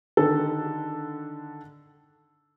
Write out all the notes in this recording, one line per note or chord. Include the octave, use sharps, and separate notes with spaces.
D3 D#3 A4